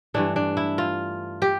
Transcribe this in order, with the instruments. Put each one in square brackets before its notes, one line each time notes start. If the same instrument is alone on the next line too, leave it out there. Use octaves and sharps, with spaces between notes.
[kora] G2 E3 A3 D4
D4
E4
F4
G4